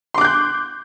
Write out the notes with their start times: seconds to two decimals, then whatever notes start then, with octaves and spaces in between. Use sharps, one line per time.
0.14 C6
0.18 D6
0.21 F#6
0.25 G6